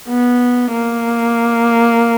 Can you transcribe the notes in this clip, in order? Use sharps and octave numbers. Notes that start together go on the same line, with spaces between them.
B3
A#3